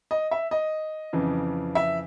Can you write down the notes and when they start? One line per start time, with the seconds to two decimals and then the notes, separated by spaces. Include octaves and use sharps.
0.11 D#5
0.31 E5
0.51 D#5
1.13 F2 C#3 E3
1.75 E5